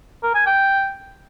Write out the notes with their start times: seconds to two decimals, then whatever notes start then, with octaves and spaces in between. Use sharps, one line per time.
0.23 A#4
0.35 G#5
0.46 G5